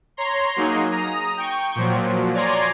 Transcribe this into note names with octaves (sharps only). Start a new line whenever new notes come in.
C#5 A#5 C6
F#3 A#3 D#4 G#4
A#5 D#6
G5 C#6
A#2 F3 F#3
C#5 D5 G#5 A#5 C6